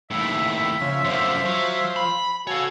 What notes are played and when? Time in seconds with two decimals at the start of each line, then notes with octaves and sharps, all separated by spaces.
0.11 D#2 A2 E5
0.81 C#3 F3
1.05 F#2 D3 F3 C5
1.45 F#3
1.96 B5
2.47 F#4 A4 C#5 F5 G#5